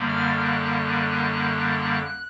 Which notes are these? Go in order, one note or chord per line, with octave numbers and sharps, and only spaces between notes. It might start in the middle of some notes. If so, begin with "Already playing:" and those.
Already playing: F#2 D3 G3 A#3
F6
F#6